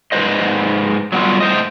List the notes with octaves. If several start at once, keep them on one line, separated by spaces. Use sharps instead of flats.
G#2 B4 C5 D#5
F#3 G3 B3 E4 F4
A2 C5 D#5